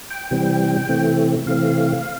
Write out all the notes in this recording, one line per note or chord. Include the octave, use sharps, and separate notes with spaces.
G5
C3 E3 G3 C4
C3 E3 A3 C4
C3 E3 A3 C4 F5